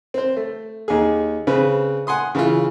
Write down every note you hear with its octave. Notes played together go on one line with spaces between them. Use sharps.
C4 C5
A3
D#2 G#4
C#3 C4 B4
F#5 G#5 C6 D#6
C#3 E3 F4